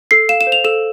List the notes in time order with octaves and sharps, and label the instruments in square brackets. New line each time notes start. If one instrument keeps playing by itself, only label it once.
[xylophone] A4 C7
F5 E7
E7
C5
F7
A4 E7